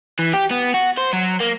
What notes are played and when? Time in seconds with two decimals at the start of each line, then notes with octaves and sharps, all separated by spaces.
0.19 E3
0.33 G4
0.51 B3
0.74 F#4
0.97 C5
1.13 F#3
1.40 A#3